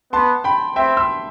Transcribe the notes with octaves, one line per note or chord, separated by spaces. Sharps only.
B3 A5 C6
G5 B5
C4 E5 G5
C6 E6